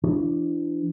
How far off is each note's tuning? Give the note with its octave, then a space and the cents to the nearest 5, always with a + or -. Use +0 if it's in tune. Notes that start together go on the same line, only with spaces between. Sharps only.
E3 +40 D4 +0